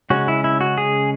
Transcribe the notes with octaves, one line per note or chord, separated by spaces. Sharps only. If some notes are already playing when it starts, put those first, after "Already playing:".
C#3 G#3 C#4 F#4
E4
E4
F#4
G#4